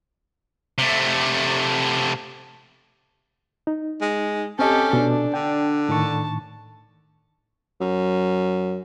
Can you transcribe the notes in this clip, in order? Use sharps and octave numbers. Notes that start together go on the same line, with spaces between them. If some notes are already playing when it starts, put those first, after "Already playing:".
C3 A3
D#4
G#3
C4 C#4 G4 A4 D#5
B2 D4
D3 G5
A2 D#3 A5 C#6
F#2